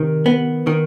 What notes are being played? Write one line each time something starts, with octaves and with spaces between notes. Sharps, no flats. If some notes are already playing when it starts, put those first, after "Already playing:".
Already playing: C3 D#3
B3
D#3